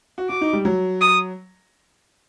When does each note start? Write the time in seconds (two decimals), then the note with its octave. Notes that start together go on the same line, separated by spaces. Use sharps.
0.18 F#4
0.29 F#4 D6
0.41 D#4
0.53 G3
0.65 F#3
1.01 D#6